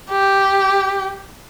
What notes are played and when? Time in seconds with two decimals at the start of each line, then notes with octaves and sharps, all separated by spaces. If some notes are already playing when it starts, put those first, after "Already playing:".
0.11 G4